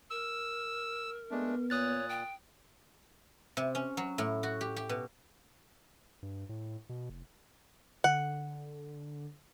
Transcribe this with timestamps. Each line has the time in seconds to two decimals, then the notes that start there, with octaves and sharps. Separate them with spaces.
0.11 A#4 E6
1.31 G#3 A3 B3 D4
1.70 A#2 C#5 D#6 F#6 A6
2.09 G5
3.57 C3
3.75 C#4
3.97 F#3
4.18 A2
4.43 F#4
4.61 G4
4.76 G4
4.89 B2
6.22 G2
6.49 A2
6.89 B2
7.09 F1
8.04 D3 F#5